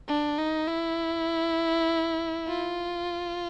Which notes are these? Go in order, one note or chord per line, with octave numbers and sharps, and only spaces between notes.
D4
D#4
E4
F4